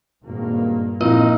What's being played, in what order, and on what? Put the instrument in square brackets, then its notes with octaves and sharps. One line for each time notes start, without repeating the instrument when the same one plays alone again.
[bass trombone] G#1 [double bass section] G2 A#2 A#3
[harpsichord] A#1 [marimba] C4 E4 [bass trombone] D#4